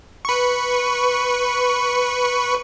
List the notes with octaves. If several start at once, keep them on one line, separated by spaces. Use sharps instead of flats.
B4 C#6